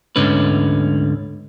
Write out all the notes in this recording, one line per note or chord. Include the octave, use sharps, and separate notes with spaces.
D2 G#2 D3 C#4 B4